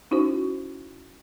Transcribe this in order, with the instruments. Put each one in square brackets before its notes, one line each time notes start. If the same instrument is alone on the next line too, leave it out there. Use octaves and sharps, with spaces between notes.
[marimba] C#4 D#4 E4 F#4 C5